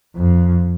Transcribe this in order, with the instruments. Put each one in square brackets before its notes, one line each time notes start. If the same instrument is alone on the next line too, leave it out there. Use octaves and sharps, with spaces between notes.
[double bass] F2